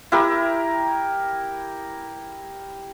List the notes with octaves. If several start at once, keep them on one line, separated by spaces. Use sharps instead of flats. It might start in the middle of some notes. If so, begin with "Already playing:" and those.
E4 G4 A#4